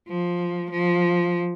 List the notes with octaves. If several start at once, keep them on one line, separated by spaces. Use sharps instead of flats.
F3
F3